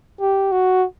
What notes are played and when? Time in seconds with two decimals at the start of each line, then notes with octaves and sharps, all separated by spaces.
0.20 G4
0.52 F#4